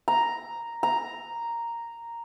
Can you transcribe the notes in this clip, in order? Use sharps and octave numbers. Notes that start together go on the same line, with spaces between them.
A#5
A#5